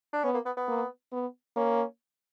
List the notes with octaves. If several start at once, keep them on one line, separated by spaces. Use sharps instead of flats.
D4
B3 C#4
A#3
B3
B3
A#3
B3
A#3 C#4